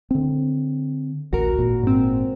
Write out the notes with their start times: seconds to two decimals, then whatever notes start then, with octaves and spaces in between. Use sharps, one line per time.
0.11 D3 C4
1.33 A1 D2 F#4 A#4
1.59 G#1 A#2
1.84 G#2 C4